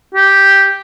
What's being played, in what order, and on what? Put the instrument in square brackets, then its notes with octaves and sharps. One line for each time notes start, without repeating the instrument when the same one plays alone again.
[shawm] G4